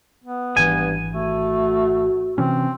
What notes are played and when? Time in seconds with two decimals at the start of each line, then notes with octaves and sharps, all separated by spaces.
0.24 B3
0.57 G#1 G2 E3 G#5
1.13 A3 F#4
2.38 C3 E3 C4 C#4